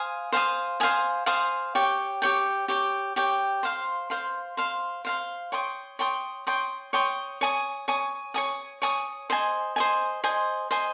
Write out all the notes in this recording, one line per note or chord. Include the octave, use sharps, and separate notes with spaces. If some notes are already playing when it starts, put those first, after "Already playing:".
Already playing: C5 F5 G#5 D#6
C5 F5 G#5 D#6
C5 F5 G#5 D#6
C5 F5 G#5 D#6
G4 C#5 G5
G4 C#5 G5
G4 C#5 G5
G4 C#5 G5
C5 F5 C6
C5 F5 C6
C5 F5 C6
C5 F5 C6
C#5 G5 C6 D#6
C#5 G5 C6 D#6
C#5 G5 C6 D#6
C#5 G5 C6 D#6
C#5 G#5 D#6
C#5 G#5 D#6
C#5 G#5 D#6
C#5 G#5 D#6
C5 D#5 G#5
C5 D#5 G#5
C5 D#5 G#5
C5 D#5 G#5